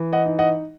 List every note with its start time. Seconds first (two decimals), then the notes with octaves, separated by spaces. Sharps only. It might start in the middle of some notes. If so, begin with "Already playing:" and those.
Already playing: E3
0.13 D#5 F#5
0.26 D#4
0.39 D#5 F#5